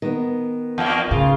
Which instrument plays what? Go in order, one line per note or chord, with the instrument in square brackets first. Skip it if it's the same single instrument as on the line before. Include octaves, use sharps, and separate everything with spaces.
[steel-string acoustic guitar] D#3 B3
[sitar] E2 A#3
[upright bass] A2 [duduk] C#3 [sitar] F4